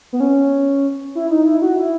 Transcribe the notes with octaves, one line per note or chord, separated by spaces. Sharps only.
B3
C#4
E4
D#4
E4
F#4
E4